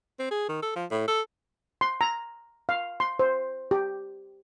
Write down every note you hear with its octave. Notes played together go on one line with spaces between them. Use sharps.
C4
G#4
D#3
A4
F3
A2
A4
C6
A#5
F5
C6
C5
G4